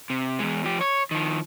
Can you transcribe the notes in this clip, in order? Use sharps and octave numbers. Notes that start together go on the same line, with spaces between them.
C3
E2 G#3
F3 G4
C#5
D#3 F3